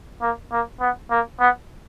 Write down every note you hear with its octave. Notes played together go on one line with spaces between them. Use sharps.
A#3
A#3
B3
A#3
B3